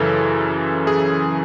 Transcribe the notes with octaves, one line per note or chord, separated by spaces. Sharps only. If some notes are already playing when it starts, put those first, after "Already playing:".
Already playing: F#2 C#3 E3 A4
G#4